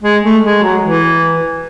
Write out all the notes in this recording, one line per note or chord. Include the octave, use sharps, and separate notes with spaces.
G#3
A3
G#3
F#3
E3